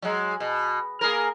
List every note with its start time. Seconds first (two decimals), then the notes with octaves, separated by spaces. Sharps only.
0.02 F#3 G#3
0.40 B2
1.01 A#3 G#4 A#4